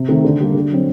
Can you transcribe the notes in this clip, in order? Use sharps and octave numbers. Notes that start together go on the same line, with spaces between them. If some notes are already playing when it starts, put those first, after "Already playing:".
Already playing: C3
D#3 A3 C4
D3
G3 A#3
D3
F#3 C4